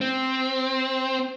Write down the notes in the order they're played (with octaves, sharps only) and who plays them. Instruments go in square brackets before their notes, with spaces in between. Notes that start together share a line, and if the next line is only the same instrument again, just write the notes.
[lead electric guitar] C4